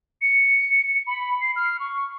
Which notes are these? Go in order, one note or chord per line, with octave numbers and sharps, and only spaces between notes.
C#7
B5
C7
F6
C#6